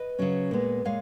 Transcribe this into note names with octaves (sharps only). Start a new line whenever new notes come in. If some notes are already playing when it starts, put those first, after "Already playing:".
Already playing: B4 D#5
C#3 F#3 C#4
A#2 G#3 B3
A#2 G#3 C#5 F5